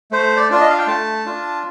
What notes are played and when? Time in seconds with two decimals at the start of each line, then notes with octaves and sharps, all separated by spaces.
0.12 A3 C5
0.37 D5
0.50 D4 F4 D5
0.60 D#5
0.70 F5
0.78 G5
0.87 A3 A5
1.25 D4 F4